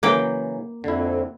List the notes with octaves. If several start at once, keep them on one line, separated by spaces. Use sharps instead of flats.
C#3 E3 F#3 A#3 G5
F2 D3 E4